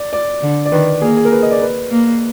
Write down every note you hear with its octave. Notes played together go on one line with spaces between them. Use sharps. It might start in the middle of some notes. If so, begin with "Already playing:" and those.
Already playing: D5
D5
D3
D5
D#3 B4
A#3 G#4
G#4
A#4
B4
D#5
D5
B4
A#3